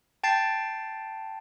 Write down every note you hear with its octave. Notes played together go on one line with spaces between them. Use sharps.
G5 A5 A6 C7